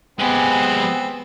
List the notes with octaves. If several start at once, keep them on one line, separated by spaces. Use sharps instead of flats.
G#3 B3 C4 G4 G#5